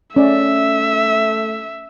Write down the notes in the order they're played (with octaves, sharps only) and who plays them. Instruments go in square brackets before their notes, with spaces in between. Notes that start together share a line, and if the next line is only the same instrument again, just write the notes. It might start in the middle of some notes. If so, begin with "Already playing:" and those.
[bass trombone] A3 [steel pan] C#4 D5 [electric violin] E5